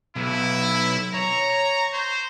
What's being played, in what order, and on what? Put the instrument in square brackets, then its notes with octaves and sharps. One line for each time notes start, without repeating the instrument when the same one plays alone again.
[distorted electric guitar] B1 [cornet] E4
[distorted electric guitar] C#5 [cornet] A#5
[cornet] C5